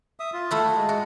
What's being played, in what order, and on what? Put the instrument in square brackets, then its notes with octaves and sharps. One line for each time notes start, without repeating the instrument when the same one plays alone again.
[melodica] E5 D#6
F4
[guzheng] A3 E4 F#4
[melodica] G#3
[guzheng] F#4